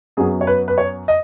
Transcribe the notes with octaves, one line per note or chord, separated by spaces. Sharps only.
F#2 F#3 B3 G#4
C#5
B4
B4
C#5
D#5